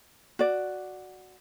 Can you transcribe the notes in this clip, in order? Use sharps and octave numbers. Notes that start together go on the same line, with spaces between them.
F#4 D5